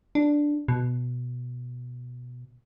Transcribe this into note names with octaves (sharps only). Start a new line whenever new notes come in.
D4
B2